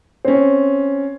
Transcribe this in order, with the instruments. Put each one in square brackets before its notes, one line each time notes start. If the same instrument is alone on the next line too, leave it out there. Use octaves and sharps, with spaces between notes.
[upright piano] C4 C#4